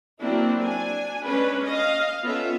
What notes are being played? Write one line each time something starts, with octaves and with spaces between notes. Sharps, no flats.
F#3 A#3 C4 D4 E4
D4 G#5
G#3 C#4 D4 B4
D#5 F5
B3 C#4 F4 A4 E5